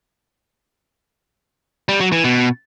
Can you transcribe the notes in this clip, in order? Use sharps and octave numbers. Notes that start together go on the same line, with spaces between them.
G3
F#3
E3
B2